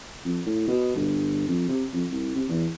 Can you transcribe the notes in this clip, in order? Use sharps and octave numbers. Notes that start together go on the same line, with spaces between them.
F2
A2
B2
G1
F2
C3
F2
C2
C3
E2